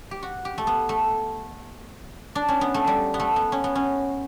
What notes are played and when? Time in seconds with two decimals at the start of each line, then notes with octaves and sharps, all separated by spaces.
0.11 G4
0.23 F#4
0.45 G4
0.58 A3
0.67 B3
0.89 A3
2.35 D4
2.48 C#4
2.61 B3
2.74 A3
2.87 G3
3.14 B3
3.20 A3
3.36 B3
3.52 C#4
3.64 B3
3.75 C#4